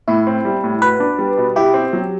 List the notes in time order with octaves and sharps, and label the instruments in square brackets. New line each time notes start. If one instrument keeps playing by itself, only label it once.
[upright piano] A2 [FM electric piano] E4
[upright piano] C4
G3
A2
[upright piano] F#4 [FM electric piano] B4
[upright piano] D4
G3
B2
[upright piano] E4 [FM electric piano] G4
[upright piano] C4
F#3